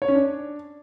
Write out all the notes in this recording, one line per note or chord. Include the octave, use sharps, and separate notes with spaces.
C#5
C#4
D4